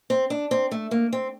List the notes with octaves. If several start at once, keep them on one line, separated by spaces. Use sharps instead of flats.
C4
D4
C4
A3
A#3
C4